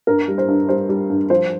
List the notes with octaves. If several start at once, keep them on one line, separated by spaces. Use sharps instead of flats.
G2 A#4
G3
C5
G2
G3 C5
G3
G2
F3 C5